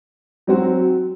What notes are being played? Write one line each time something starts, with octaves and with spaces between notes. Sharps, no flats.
F#3 C4 F#4